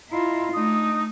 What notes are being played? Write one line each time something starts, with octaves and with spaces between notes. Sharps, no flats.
E4 F4 D#5 A#5
A3 D4 D#4 D#6